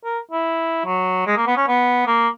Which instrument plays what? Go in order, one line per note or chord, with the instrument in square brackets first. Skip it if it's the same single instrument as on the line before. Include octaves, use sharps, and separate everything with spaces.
[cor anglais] A#4
E4
F#3
G#3
A#3
B3
C#4
B3
A#3